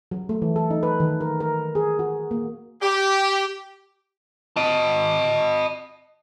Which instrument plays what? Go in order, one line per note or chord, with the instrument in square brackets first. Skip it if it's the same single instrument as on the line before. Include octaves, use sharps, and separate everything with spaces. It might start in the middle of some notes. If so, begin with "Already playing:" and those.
[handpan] F#3
A3
E3
A4
D#4
B4
D#3
A#4
A#4
G#4
F#4
A#3
[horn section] G4
[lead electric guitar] D#5 A5